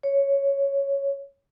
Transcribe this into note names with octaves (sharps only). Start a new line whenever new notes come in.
C#5